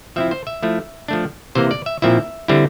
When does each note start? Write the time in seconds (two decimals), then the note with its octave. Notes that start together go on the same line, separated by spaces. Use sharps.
0.16 F3 C4 E4 E5
0.31 C5
0.47 E5
0.63 F3 A3 E4
1.08 F3 A3 D4
1.55 C3 E3 A#3 C5
1.71 D5
1.86 E5
2.02 A#2 F3 C4 E4 E5
2.48 D3 G3 C4 E4